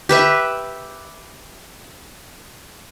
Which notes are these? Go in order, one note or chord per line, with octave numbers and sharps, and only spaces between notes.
G4 B4 E5